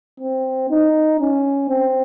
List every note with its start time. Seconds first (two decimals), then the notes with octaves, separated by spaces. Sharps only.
0.20 C4
0.70 D#4
1.20 C#4
1.69 C4